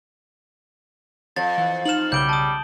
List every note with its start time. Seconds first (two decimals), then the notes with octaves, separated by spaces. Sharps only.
1.36 F2 A6
1.58 E3
1.85 D#4 C5 F6 E7 F#7
2.12 B1 C#3 G3 G6 D7 G7
2.29 A5 D#6